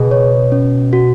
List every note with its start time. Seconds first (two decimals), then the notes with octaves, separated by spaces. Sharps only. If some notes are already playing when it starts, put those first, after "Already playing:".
Already playing: B2 G#4
0.11 C#5
0.52 C#4
0.93 F#4